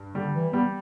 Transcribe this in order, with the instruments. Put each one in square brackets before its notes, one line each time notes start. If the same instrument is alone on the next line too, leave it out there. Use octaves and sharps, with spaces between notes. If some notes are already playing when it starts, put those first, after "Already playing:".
Already playing: [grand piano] G2
[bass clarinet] D3 [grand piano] G3
[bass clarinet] E3
[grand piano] G3 [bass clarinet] B3